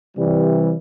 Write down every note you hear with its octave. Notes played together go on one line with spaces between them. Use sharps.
C3 E3 G3